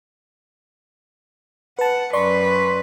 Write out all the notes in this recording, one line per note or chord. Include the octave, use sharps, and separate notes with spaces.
B4 F#5 A5
F#2 B4 D5 C6 C#6